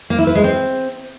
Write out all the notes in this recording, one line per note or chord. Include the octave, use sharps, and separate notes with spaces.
A#3
E4
B4
G#3
C4